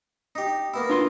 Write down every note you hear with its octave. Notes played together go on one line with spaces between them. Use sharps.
D#4 G4
A#3 B3 E4
D4 F4 C6